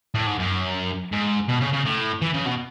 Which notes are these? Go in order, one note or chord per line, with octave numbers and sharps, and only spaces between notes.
A2
G#2
F#2
G#2
B2
C#3
C#3
A2
E3
C#3
B2